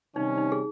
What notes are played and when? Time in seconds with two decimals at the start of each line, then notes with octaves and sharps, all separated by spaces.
0.16 C3 D#3 G3 C#4 D#4
0.37 D#4
0.52 G#4